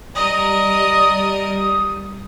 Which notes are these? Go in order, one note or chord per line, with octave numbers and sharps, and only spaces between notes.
G3 A#4 D5 D#5 D#6